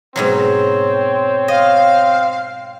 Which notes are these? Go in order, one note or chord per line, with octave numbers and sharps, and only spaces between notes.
G#2 B2 F#3 C4 C#5
D#5 F5